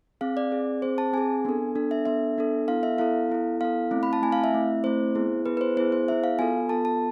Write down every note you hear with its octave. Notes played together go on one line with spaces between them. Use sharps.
C4 G#4 F5
D5
C4 G#4
C4 G#4 C5
A5
C4 G#4 G#5
B3 D4 A4
B3 D4 A4
E5
B3 D4 A4 E5
B3 D4 A4
B3 E4 A4 F5
E5
B3 E4 A4 F5
B3 E4 A4
B3 E4 A4 F5
A3 C4 E4
B5
A5
A3 C4 E4 G#5
F5
E5
A3 C4 E4
A3 C4 E4 C5
B3 E4 G#4
B3 E4 G#4 B4
B4
C5
B3 E4 G#4 C5
C5
B3 E4 G#4 E5
F5
B3 F4 A4 G#5
B3 F4 A4 A5
A5